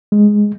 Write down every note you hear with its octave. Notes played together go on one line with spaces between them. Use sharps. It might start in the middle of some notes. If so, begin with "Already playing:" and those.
G#3